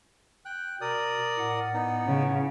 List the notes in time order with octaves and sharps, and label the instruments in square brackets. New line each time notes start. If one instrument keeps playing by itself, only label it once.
[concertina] G5 F#6
[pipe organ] B2 [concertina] A#4 D5 D#6
[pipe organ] A2 F#5
[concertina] B3 D#4
[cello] C#3